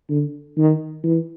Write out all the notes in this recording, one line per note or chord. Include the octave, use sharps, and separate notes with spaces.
D3
D#3
E3